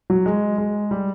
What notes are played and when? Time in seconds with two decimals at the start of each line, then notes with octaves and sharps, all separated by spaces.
0.10 F#3
0.26 G#3
0.58 G#3
0.91 G3